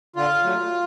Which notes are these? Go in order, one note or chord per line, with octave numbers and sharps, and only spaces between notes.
D3 F4
F#3 A3